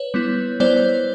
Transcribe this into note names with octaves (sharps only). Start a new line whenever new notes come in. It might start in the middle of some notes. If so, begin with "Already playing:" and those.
Already playing: B4 C#5
G3 B3 E4
G3 B3 E4 C5 D5